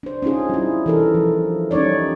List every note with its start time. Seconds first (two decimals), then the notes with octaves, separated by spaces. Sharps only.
0.03 D4 C5
0.22 C#4 D#4 F4 G#4
0.49 G3 E4
0.86 E3 A4 A#4
1.15 F3
1.71 G3 C#4 D#4 C#5 D5